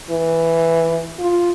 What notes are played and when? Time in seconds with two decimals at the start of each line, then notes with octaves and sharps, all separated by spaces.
0.10 E3
1.19 F4